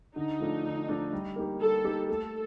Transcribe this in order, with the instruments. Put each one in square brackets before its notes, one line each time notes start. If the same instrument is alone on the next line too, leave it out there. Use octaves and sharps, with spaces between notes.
[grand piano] D3 [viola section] D#4
[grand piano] F3 A3 D4
D3
F3 A3 D4
G3
A#3 D#4 G4 A#4
[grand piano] G3 [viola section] A4
[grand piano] A#3 D#4 G4 A#4
[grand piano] A3 [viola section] A4